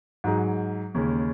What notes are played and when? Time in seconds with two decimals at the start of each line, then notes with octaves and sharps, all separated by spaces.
0.24 G#2 F#3 D#4 G#4
0.94 D#2 C#3 G#3 C#4